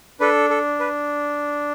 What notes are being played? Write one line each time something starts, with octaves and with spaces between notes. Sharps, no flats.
D4 A4 B4
A4
B4